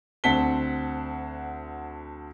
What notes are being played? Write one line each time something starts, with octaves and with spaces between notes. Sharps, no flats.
D2 C4 F#5 A5 B6 G7